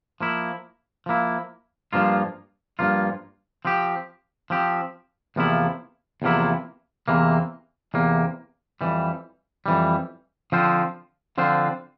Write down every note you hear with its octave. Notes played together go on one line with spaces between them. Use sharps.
F3 A#3 E4
F3 A#3 E4
G2 F3 A#3 F4
G2 F3 A#3 F4
F3 C4 G4
F3 C4 G4
E2 C3 F3 A#3 E4
E2 C3 F3 A#3 E4
E2 C3 E3 A#3
E2 C3 E3 A#3
F2 E3 G3
F2 E3 G3
D3 F3 C4 F4 C5
D3 F3 C4 F4 C5